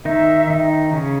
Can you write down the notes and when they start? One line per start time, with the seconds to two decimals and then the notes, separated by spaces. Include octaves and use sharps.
0.05 D#3 D#4 E5
0.50 D#3 D#4
0.93 C#3 C#4